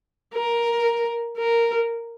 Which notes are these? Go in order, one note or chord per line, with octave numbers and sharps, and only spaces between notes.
A#4
A#4